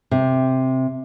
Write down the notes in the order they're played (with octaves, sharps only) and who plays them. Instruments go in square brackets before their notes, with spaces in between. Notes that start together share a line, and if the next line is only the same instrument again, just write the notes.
[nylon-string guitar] C3